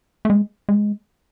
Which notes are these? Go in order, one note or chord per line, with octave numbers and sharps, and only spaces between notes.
A3
G#3
G#3